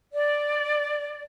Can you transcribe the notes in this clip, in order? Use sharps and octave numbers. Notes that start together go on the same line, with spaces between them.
D5